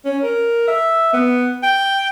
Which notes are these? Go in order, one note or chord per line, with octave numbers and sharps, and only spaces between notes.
C#4
A#4
E5
B3
G5